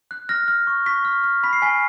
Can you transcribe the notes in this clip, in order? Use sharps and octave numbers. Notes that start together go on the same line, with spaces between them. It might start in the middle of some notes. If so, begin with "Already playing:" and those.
F#6
F6 A#6
F6
C#6
C#6 B6
F6
F6
B5 B6
C7
G#5 B6